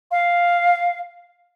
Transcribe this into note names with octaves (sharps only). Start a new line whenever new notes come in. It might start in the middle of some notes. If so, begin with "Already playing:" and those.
F5